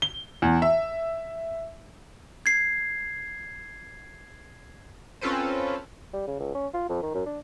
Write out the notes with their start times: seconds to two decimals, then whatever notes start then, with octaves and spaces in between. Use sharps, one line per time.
0.02 G7
0.42 E2
0.62 E5
2.46 G#6 C7
5.21 C4 C#4 F4 A4 B4 C5
6.13 G3
6.27 C#3
6.39 C#2
6.54 C#4
6.74 F4
6.89 F2
7.02 D#3
7.14 F#2
7.26 D4